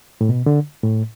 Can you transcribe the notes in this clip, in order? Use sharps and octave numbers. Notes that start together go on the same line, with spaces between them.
A2
B2
D3
A2